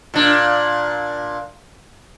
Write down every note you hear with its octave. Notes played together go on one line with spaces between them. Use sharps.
A#2 D4